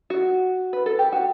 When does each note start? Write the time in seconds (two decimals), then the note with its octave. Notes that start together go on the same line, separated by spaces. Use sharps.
0.10 F#4
0.73 B4
0.86 A4
0.99 G4
1.12 F#4